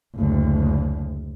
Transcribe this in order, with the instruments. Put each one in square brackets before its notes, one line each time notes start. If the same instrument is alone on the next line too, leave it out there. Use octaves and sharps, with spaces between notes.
[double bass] F#1 D2